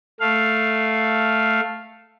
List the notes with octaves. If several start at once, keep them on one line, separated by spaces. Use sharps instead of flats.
A3 F5